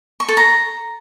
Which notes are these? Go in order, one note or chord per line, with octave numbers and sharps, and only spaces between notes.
C#6
A4
A#5